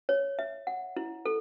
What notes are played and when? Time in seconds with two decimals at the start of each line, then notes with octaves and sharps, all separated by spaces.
0.09 C#5
0.39 E5
0.67 F#5
0.97 E4
1.25 A4